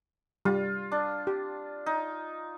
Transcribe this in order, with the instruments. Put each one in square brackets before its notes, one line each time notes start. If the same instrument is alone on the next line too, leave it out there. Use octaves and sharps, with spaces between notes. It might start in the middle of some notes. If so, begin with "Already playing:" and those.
[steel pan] G3 [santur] F4
[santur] D4
[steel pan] G4
[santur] D#4